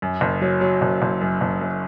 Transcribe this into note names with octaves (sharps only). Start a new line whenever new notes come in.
F#2
F#1
F#3
F#3
F#1
F#1
F#2
F#1
F#2